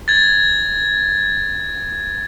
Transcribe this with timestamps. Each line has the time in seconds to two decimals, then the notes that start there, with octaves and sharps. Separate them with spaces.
0.08 G#6 A6